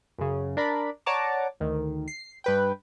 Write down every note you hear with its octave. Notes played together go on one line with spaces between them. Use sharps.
F#2 C#3
D4 A#4 D5 B5
C#5 D5 F#5 A5 A#5 D6
D2 D#3
C7
G2 B4 G5